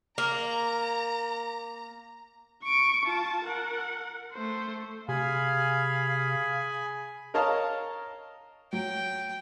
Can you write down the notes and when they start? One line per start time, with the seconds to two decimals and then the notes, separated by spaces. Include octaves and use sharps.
0.18 A#3 A#5
2.64 C#6 D7
3.06 F4 A5
3.45 A#4 F#5
4.33 A3 C5
5.08 C3 G#4 F5 G#5 B5
7.34 A#4 C#5 D#5 F5 A5 A#5
8.73 F#3 G5